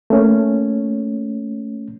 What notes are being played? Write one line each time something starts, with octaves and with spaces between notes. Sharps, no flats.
A3 A#3 C#4